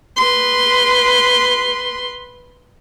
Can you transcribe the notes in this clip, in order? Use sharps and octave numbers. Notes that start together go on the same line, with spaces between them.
B4 C6